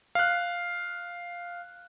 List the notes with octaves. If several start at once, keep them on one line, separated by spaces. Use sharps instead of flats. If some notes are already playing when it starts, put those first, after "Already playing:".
F5 F#6